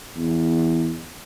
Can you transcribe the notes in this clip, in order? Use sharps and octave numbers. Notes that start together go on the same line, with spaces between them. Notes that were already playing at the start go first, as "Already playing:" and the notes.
E2